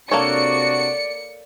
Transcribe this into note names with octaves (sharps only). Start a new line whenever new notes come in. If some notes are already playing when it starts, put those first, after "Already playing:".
C3 A#3 D4 F#4 A4 C#5 D5 C#7